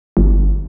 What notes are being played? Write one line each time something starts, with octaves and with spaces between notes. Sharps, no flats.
G1